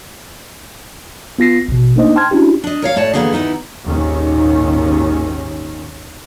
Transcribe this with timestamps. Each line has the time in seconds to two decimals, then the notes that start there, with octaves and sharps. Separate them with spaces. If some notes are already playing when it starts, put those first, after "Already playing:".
1.39 B3 F4 A#6 C7
1.68 A1 B2
1.96 A3 A#3 D4 D#4 C5 D#5
2.16 G5 A5 C6 F6 G#6
2.31 C#4 D4 E4 F#4 G4
2.64 D4 D#5
2.82 A#4 C#5 F5
2.96 A2 A3 C#5 D5 A5
3.14 D3 E3 A#3 B3 D#4 G#4
3.33 D#2 B3 D#4 E4
3.84 G#1 D#2 A#2 D#3 C#4